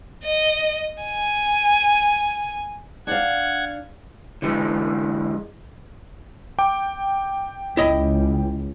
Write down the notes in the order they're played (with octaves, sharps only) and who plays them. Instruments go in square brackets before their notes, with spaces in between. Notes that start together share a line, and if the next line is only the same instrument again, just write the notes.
[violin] D#5
G#5
[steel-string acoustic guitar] D4 D5 F5 [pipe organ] F#5 G#6
[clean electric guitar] D3 E3 G#3
[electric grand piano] G5 D6
[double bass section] C#2 [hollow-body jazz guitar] E4 D#5 B5